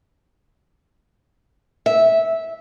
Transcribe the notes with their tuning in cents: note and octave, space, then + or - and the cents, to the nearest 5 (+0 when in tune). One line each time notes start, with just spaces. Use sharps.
E5 -10